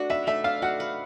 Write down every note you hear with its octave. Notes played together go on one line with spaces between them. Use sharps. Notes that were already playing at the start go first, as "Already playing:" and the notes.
Already playing: A3 D4 F#4
B4 E5
A3 E5
D4 F5
F#4 F#5
B4